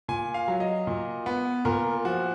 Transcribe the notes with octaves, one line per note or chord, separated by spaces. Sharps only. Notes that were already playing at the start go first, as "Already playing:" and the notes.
A#2 G#5
F5
F#3
D#5
A#2
B3
A#2 A#4
F3 F#4